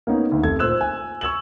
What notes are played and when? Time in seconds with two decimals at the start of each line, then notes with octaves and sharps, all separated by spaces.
0.07 A#3 B3 C#4 D#4
0.29 D2 D#3
0.43 F1 A4 G#6
0.59 A#2 C5 E6 F#6 E7
0.81 G#5
1.21 C#6 E6 G#6 E7 F#7